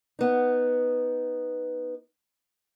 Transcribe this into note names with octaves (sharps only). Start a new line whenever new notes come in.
B3 D#4